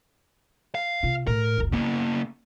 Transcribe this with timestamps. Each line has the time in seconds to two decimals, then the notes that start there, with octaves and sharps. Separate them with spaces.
0.75 F5
1.03 C3 F4
1.27 A2 A#4
1.58 F#1 C#2
1.72 C#3 A#3 B3